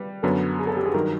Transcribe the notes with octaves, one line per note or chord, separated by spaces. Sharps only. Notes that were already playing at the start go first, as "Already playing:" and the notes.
Already playing: G3 B4
F#2 D3 F#3 B3 A4
G#4
A4
G4
G#4
G2 D#3 F#3 A#4